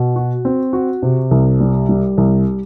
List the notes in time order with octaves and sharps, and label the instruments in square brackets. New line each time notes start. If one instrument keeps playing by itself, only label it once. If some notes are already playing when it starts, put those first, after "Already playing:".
Already playing: [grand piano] B2
F#4
C4
F#4
C3
C2
G3
G3
C2